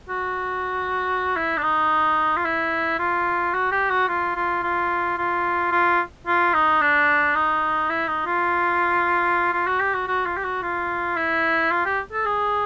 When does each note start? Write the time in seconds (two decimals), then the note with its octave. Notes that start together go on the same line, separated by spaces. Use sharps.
0.09 F#4
1.37 E4
1.57 D4
1.63 D#4
2.37 F4
2.45 E4
2.99 F4
3.54 F#4
3.72 G4
3.90 F#4
4.09 F4
4.35 F4
4.63 F4
5.18 F4
5.72 F4
6.27 F4
6.54 D#4
6.81 D4
7.35 D#4
7.90 E4
8.08 D#4
8.26 F4
9.53 F4
9.67 F#4
9.80 G4
9.94 F#4
10.08 F#4
10.26 F4
10.37 G4
10.44 F#4
10.62 F4
11.17 E4
11.71 F4
11.85 G4
12.13 A4
12.25 G#4